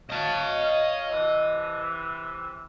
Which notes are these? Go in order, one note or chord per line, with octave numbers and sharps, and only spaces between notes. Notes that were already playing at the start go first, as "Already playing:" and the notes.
C#5 D#5 F5 A5
C3 E3